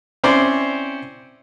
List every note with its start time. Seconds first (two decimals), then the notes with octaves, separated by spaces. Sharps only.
0.24 C4 C#4 E4 C5 D5